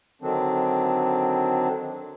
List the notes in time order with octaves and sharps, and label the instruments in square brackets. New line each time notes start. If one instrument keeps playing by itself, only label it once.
[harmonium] D3 D#3 F#3 C4 D4